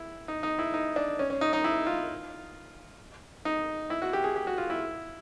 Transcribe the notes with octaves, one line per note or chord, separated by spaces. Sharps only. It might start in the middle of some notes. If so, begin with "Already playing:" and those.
Already playing: E4
D#4
D#4
E4
D#4
D4
C#4
C#4
D#4
D#4
E4
F4
D#4
E4
F#4
G4
G#4
G4
F#4
F4
E4